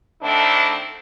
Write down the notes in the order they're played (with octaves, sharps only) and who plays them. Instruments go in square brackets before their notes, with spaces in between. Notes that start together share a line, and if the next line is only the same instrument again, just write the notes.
[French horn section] D3 D#3 A3 C4 D4 E4